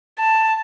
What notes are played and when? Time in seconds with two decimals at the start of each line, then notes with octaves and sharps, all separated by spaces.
0.19 A5